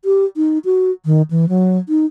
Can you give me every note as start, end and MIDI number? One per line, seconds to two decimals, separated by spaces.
0.05 0.25 67
0.37 0.59 63
0.65 0.91 66
1.05 1.22 51
1.31 1.45 52
1.49 1.78 54
1.89 2.06 63